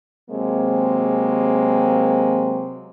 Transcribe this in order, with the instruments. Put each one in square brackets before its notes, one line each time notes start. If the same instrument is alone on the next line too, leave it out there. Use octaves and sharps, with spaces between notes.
[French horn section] C3 F#3 G#3 A#3 C4